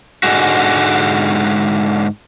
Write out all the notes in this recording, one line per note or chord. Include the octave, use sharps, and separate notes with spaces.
G#2 D3 D#3 G#3 F#4